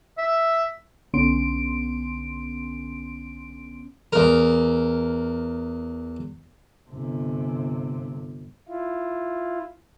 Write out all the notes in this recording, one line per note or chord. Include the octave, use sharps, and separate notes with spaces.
E5
B1 D3 B3 C#4 C6 D7
E2 A#4
G1 C3
E4 F4